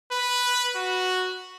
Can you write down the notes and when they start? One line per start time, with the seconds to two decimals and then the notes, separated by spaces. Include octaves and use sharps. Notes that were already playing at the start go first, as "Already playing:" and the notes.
0.12 B4
0.76 F#4